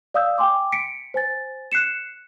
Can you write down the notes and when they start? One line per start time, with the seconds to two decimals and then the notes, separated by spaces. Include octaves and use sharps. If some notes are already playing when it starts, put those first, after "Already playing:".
0.14 D5 F5 D#6 E6 G6
0.38 G5 G#5 C6 D6
0.72 B6 C#7 D7
1.14 C5 G#5 A6
1.72 F#6 C7 C#7 E7